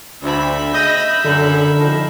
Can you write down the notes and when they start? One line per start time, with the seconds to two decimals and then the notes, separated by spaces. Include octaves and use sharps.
0.23 D2 D4 C5 E5 B5
0.72 C#3 D#5 G6
1.24 F#2 D3
1.78 D#3 F3 A5